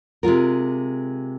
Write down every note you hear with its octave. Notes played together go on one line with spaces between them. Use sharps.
C3 G#3 F4 A#4